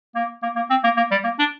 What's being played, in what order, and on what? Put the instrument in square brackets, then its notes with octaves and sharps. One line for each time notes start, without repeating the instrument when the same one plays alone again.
[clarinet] A#3
A#3
A#3
C4
A#3
A#3
G3
A#3
D4